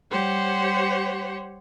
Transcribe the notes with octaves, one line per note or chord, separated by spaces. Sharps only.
G3 G4 C5 C#5 F#5